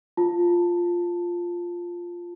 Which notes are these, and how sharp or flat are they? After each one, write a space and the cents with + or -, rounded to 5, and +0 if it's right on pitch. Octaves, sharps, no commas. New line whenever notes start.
F4 +0 A5 +10